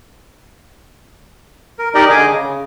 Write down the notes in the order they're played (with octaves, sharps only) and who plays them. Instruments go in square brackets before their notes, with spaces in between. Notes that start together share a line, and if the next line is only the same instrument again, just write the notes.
[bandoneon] A#4
D#4 G4 A#4 D5 D#5
D3 G#4 D#5 G#5 D6
C#3